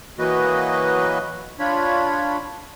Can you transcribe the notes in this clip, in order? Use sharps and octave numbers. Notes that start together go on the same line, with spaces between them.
E3 F#3 A#3 F#4 B4 D#5
D4 F4 C#5 B5